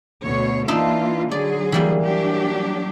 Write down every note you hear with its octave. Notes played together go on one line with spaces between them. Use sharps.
D2 B2 C#5
E3 A#3 D4 D#4 F4 E5
D3 F#3 G#4 D5
E3 G3 A#3
F#3 D4 G4